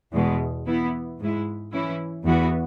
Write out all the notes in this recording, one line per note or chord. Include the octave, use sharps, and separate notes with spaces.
E2 B2 G#3
E3 B3 E4
G#2 G#3 E4
E3 C#4 E4
E2 E3 B3 F#4